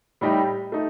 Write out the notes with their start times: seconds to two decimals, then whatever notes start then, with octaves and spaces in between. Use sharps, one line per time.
0.21 A2 G3 D#4 G4
0.72 A3 D#4